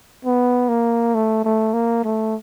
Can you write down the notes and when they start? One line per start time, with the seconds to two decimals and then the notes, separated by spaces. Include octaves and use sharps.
0.25 B3
0.69 A#3
1.15 A3
1.44 A3
1.73 A#3
2.04 A3